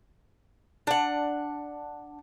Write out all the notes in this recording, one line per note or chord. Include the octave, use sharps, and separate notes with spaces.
D4 F#5